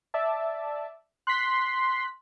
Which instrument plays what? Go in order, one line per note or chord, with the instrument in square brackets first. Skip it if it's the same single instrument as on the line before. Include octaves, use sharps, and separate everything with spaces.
[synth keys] D5 E5 A5
[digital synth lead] C6 [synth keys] F#6 B6